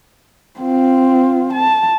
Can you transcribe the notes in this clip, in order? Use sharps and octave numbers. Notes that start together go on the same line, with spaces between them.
C4 F4
A5